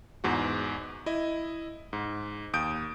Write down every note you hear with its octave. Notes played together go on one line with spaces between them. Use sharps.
E2 G#2 F#4
E4 D#5
G#2
D#2 D#6 G6 D7